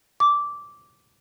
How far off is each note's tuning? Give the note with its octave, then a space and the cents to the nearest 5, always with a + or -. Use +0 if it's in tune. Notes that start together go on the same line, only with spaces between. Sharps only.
D6 -10